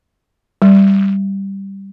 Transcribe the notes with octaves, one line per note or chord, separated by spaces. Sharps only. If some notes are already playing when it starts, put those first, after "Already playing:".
G3